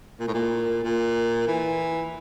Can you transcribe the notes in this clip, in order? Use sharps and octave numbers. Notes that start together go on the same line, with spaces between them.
A#2
A2
A#2
A#2
E3